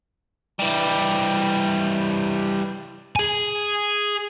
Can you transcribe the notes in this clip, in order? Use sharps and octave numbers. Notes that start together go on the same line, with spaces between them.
E3 G3
G#4 G#5